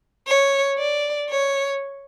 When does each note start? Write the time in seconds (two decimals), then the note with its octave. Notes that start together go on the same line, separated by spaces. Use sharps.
0.27 C#5
0.78 D5
1.29 C#5